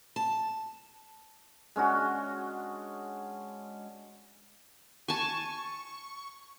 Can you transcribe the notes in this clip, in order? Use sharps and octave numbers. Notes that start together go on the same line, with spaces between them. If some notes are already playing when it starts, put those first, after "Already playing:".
A5
G#3 C#4 D4 F#4
G#5 A5 C#6